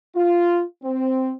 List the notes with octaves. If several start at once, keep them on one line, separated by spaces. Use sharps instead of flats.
F4
C4